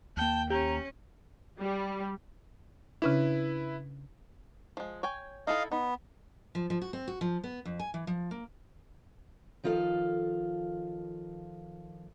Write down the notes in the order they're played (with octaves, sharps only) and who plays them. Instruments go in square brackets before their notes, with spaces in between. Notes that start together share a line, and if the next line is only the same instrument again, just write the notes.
[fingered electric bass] D#2 A#3 [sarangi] G5 [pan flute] A5
[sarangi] C#4 [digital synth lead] G4 [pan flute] A#5
[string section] G3
[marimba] C#3 C#4 D4 [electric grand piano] E4 B4
[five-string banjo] F3 G#3
C#5 G5 G#5
[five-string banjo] D#4 E4 A4 [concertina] D#5 F5
[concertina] B3 [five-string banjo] D#4
[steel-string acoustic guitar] F3
F3
F#4
C4
F#4
F3
B3
F2
G#5
E3
F3
A#3
D#3 F3 F4 A4 F5